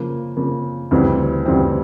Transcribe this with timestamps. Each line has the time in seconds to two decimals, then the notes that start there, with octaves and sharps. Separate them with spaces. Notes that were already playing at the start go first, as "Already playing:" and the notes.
Already playing: C#3 F3 A#3
0.37 C#3 F3 A#3
0.91 D2 C#3 E3 G3 C4
1.46 D2 C#3 E3 G3 C4